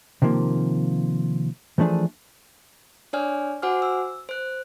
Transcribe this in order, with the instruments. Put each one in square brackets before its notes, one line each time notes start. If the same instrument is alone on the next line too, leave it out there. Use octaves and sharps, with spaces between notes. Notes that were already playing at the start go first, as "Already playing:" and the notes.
[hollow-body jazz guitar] C3 D#3 F3 A#3
E3 F3 A3 D4 G#4
[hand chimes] D4 C#5 D5 G#5 F6
F#4 C5 F#5 G#5 D6 F6
E6
C5 F#6